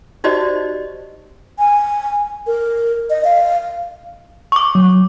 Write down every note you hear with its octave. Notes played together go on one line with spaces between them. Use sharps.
D#4 F#4 G4 C5 D5 D#5
G#5
A#4
D#5
F5
C#6 D6
F#3